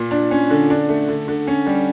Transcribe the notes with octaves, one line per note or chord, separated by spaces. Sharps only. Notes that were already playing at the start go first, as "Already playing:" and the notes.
Already playing: A#2
D4
C#4
D3
D4
A3
D3
D3
C#4
G3